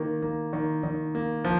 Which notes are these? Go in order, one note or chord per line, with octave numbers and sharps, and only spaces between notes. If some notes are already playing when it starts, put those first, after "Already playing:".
Already playing: D#3 A#3
A#3
D#3
D#3
A#3
F3